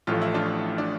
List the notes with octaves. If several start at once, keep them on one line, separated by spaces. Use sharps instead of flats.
A1 A2 F3 A3 F4
E4
D4 F4
D4